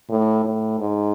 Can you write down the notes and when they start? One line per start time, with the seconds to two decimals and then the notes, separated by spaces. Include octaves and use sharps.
0.10 A2
0.44 A2
0.79 G#2